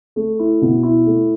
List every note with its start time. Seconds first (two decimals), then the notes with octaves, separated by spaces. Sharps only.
0.16 A3
0.39 E4
0.62 B2
0.83 E4
1.06 A3